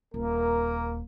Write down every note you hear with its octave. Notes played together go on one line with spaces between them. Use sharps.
D#1 A#3 A#4